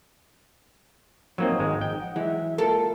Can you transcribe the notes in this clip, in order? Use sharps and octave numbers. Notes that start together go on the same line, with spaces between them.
F2 F#3 A#3 C4 D#4
G#1 G#3
G5
F#5
E3 F#3 G#3 E5
A#3 F4 A4 A#4 A5